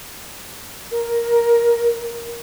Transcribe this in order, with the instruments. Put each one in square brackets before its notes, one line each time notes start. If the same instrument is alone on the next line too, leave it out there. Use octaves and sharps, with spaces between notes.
[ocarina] A#4